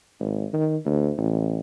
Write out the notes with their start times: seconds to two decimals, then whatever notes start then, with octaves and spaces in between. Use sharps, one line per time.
0.20 G#1
0.53 D#3
0.85 D2
1.18 A1